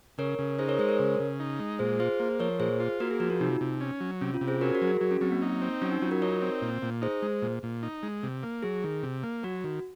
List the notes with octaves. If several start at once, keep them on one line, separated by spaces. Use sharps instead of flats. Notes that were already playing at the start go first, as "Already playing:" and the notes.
C#3 A#4 C#5
C#3
D#4 G#4 C5
A#4 C#5
G#3 G#4 C5
A#4 C#5
C#3
C#3
D#4
G#3
A#2 G#4 C5
F4 G#4 C5
A#3
F3 A#4 C#5
A#2 G#4 C5
F4
A#3 F#4 A#4
G#4
F3 F#4
F4
C3 D#4
C3
C#4
F#3
C3 C#4
F4
C3
G#4 C5
C#4 F#4 A#4
F#4 A#4
F#3
G#4
F#3 F#4
C#4
F#3 C4
A#3
D#4
C4
F#3 C#4
D#4
F#3 F4
F#4 A#4
D#4 A#4 C#5
C4
A#2
A#2
D#4 G#4 C5
G#3
A#2
A#2
D#4
G#3
C3
A#3
F#3 G#4
D#3
C3
A#3
F#3 F#4
D#3